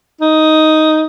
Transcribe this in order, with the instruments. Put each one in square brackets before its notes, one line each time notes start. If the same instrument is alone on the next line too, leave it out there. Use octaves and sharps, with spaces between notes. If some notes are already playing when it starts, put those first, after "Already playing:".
[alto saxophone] D#4